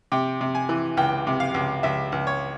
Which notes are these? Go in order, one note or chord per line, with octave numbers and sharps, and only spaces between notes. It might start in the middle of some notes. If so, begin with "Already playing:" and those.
C3 G5
C3
G#5
E3
C#2 G5
C3
F5
C#2
C#2 E5
C#2
C#5